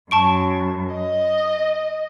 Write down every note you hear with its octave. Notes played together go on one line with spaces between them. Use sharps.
F#2 A5 C#6 D7
D#5